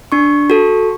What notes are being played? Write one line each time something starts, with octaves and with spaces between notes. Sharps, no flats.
D4 C#6
F#4 A4